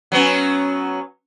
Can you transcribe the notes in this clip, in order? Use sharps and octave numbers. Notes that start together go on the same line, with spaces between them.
F#3 B3 C#4